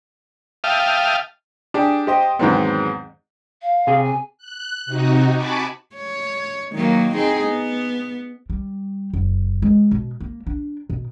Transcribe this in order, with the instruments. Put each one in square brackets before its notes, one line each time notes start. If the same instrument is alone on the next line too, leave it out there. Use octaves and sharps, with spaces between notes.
[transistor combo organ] E5 F5 G5 A5 D#6 F6
[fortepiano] D4 G4 G#4
G4 C5 D#5 G5
E2 G#2 D#3 F#3 B3 C4
[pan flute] F5
[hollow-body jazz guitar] C3 G#4
[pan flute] G#5
[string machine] F#6
C3 D#4 F#4
G#5 A5 B5 C#6 D6
[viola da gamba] C#5
D#3 F#3 A#3
C4 D#4 G#4
B3
[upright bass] G3
F#1
G#3
B2
A#3
D4
B2